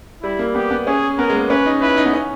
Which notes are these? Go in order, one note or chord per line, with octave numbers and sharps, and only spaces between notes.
G3 E4
A#3
B3 G4
B3
C#4 G#4
B3 A#4
G#3
A#3
C#4 B4
D#4
E4 B4
D#4
B3
C#4